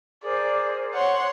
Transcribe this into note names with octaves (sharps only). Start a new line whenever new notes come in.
G#4 A#4 C5 D5
C#5 F#5 C6